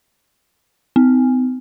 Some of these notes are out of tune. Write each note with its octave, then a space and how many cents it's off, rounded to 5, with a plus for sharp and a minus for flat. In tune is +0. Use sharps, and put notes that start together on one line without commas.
C4 -45